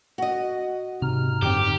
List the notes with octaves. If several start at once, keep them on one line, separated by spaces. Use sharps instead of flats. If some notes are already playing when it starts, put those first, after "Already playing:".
F#4 D#5
G#2 C3 A#5 F6
F#2 D3 C4 G4